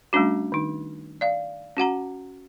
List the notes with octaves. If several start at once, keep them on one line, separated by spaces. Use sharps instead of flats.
G3 A3 C#4 D4 F#4
D#3 D#4
D5 F5
C#4 F#4 F#5 A#5